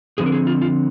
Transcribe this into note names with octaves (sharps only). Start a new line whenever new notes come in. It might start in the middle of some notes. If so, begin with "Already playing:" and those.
D3 F3 C4 G#4
A#4
G#4
F4
F4